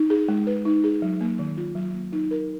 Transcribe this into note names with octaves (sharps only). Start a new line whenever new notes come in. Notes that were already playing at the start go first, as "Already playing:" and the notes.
Already playing: D#4
G#4
G#3
B4
D#4
G#4
F#3
A#3
D#3
F4
F#3
A#3
D#4
A#4